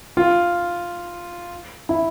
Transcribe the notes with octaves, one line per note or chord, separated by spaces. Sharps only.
F4
E4